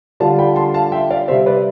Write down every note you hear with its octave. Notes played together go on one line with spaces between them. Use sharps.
D3 G3 D4 F4 F5 A5
G5 B5
A5 C6
F5 A5
E5 G5
D5 F5
C3 G3 C4 C5 E5
B4 D5